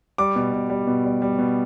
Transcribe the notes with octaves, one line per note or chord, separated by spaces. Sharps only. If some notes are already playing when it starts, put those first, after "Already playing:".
G3 D6
B2
B2
G3
B2
G3
G3
B2